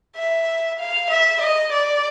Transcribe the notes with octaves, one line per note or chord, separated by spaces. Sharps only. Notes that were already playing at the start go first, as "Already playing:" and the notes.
E5
F5
E5
D#5
D5